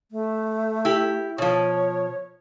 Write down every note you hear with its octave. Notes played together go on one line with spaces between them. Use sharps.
A3
E4 G4
B2 F3 C#5